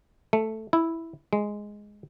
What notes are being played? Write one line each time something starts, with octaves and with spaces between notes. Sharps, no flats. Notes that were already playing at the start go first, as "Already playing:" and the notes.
A3
E4
G#3